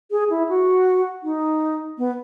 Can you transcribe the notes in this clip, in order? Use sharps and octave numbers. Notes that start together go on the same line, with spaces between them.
G#4
E4
F#4
D#4
B3